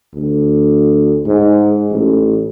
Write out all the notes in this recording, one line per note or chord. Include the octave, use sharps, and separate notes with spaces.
D2
G#2
A1